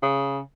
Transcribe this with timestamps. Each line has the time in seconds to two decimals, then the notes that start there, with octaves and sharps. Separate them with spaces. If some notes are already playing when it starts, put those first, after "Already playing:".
0.03 C#3